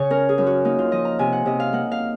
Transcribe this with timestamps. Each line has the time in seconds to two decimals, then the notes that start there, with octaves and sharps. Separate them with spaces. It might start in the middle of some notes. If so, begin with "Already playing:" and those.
Already playing: C#3 C#5
0.10 C#4 A#4
0.29 G#4
0.38 F#2
0.47 F#4
0.65 A#3 D#4
0.79 F4
0.92 F3 D#5
1.05 A#5
1.19 C3 G#5
1.33 F#5
1.46 C3 D#5
1.60 F5
1.73 A#3 F#5
1.91 F5